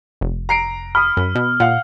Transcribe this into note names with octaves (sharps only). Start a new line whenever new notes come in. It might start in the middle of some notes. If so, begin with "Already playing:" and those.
F1
A#5 C7 D7
B5 D#6 F6
F#2
B2
A#2 F5 F#5